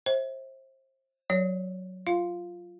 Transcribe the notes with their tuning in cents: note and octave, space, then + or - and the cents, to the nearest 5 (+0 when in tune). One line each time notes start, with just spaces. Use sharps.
C5 +25 E5 -25
F#3 +0 C#5 +0
F4 +0 F5 +0